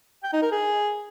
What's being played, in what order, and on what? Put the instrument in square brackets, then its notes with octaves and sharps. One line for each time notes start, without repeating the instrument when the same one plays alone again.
[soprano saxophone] G5
D#4
A#4
G#4